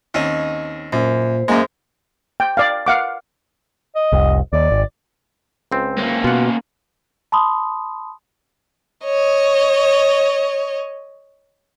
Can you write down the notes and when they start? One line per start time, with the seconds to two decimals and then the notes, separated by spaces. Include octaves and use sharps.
0.14 D#2 C4 C#4 D#4
0.92 F#2 A#2 C5
1.48 F#2 G#3 A#3
2.40 G5
2.57 D5 F5
2.86 F5 F#5 D6
3.95 D#5
4.12 F1 C2
4.53 D#2 D5
4.71 G#1
5.72 C#2 C4
5.98 A#3 C#4
6.24 B2 F4 F#5
7.32 A5 B5 C6 D#6
9.04 C#5 D#5